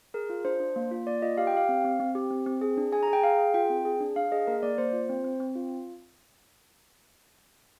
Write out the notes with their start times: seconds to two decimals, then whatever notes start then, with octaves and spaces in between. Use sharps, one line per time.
0.14 G#4 A#4
0.30 F4
0.45 D4 C5
0.60 D4
0.76 A#3
0.91 F4
1.07 A#3 D5
1.22 F4 D#5
1.38 G4 F5
1.47 G5
1.53 G4 F5
1.69 C4
1.84 C4
2.00 C4
2.15 G4
2.31 C4
2.46 C4
2.61 G#4
2.77 D4
2.92 G#4 G#5
3.03 A#5
3.08 G#4
3.13 G5
3.24 G#4 F5
3.39 G#4
3.54 F4 G5
3.70 C4
3.85 G#4
4.00 D4
4.16 D4 F5
4.32 G#4 D#5
4.47 A#3 A#4
4.63 A#3 D5
4.78 A#3 C5
4.93 F4
5.09 C4
5.24 C4
5.40 C4
5.55 F4